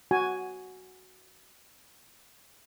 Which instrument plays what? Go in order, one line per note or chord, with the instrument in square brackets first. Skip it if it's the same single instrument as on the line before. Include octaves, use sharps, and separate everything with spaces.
[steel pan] F#4 G#5